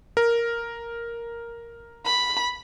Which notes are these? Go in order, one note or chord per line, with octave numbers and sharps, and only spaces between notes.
A#4
B5